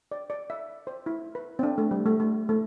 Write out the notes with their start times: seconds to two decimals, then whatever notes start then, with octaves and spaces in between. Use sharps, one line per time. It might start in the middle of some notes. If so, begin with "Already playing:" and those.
0.12 D5
0.30 D5
0.50 E5
0.87 C5
1.06 E4
1.35 B4
1.59 C4
1.63 D4
1.78 A3
1.91 G3
2.06 A3
2.20 A3
2.49 A3